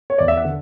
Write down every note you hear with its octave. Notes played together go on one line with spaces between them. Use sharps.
C#5
E2 D5
E5
F#5
D3